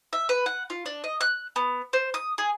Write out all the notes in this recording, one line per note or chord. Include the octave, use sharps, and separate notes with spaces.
E5
B4
F#5
F4
D4
D#5
F#6
B3
C5
D#6
G#4